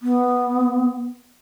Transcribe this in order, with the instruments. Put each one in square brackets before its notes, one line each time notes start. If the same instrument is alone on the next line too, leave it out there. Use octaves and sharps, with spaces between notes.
[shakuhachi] B3